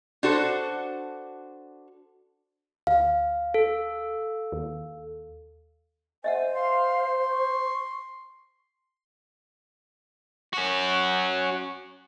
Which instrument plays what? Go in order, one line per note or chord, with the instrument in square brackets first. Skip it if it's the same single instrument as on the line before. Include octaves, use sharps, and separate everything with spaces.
[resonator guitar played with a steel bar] D4 F#4 A4 C5
[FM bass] D2 [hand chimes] F5
[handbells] A4
[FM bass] D#2
[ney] C5 [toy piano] D#5 E5 F#5 [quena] G#5
[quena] F5 [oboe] C6
[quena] C#6
[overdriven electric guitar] C#4 F#4